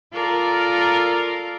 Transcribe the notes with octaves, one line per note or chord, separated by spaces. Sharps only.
F4 A4 A#4 D5 A#5